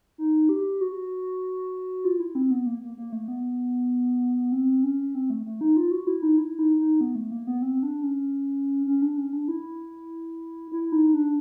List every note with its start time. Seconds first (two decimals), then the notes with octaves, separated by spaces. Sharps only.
0.18 D#4
0.49 G4
0.81 F#4
2.05 F4
2.20 E4
2.35 C4
2.51 B3
2.67 A#3
2.82 A#3
2.97 A#3
3.12 A3
3.28 B3
4.52 C4
4.84 C#4
5.15 C4
5.30 A3
5.46 A3
5.61 D#4
5.77 F4
5.91 F#4
6.07 E4
6.23 D#4
6.38 E4
6.59 D#4
6.79 D#4
7.01 B3
7.15 A3
7.31 A#3
7.47 B3
7.62 C4
7.83 D4
8.03 C#4
8.87 C#4
9.02 D4
9.17 C#4
9.33 D4
9.48 E4
10.72 E4
10.92 D#4
11.14 D4